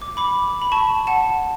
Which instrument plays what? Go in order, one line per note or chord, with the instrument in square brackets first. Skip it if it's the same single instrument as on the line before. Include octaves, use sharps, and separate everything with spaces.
[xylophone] D6
B5 D6
B5
A5 C#6
F#5 A5